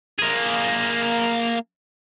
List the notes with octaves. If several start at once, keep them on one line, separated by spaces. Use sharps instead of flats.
A#3 G#4